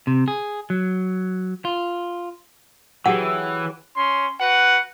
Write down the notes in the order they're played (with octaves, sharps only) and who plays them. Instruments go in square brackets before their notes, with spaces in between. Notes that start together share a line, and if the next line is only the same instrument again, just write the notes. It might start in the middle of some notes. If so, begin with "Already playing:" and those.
[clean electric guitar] C3
G#4
F#3
F4
[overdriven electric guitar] E3 [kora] F#3 G4 G#4 [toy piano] F#5
[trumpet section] C#4 C6
F#4 B4 F#5